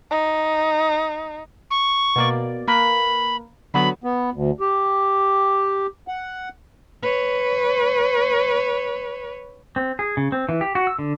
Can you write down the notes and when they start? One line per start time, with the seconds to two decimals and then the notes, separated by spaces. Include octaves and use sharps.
0.11 D#4
1.71 C#6
2.16 B2 A#3 D5
2.68 A#3 A#4 B4 B5
3.74 D3 F#3 B3 B5
4.04 B3
4.34 D2
4.60 G4
6.08 F#5
7.03 B4 C#5
9.76 C4
9.99 G#4
10.17 C#3
10.32 C4
10.49 E3
10.61 G4
10.75 F#4
10.87 E6
10.99 D3